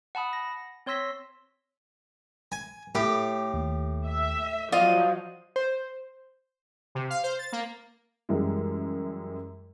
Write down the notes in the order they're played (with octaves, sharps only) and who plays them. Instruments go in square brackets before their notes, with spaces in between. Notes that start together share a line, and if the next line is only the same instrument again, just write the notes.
[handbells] F#5 A5 B5 D#6
A#6
C4 C#5 C6 E6 A#6 B6
[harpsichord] G#5
[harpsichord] A2 [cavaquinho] G4
[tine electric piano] D#2
[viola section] E5
[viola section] F3 F#3 [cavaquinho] F4 D#5 F5 [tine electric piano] D5
[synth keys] C5
[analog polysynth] C3
F5
C5
A6
A#3
[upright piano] F#2 E3 G3 G#3